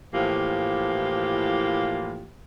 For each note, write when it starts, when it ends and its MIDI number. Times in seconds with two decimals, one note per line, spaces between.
0.14 2.28 45
0.14 2.28 52
0.14 2.28 53
0.14 2.28 58
0.14 2.28 65
0.14 2.28 67